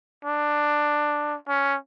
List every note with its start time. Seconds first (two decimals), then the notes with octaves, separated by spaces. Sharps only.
0.25 D4
1.48 C#4